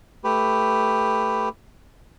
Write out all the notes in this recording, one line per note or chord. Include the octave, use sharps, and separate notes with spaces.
A3 G4 B4